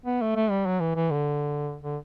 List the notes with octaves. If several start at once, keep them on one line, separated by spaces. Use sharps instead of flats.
B3
A3
A3
G3
F#3
E3
E3
D3
D3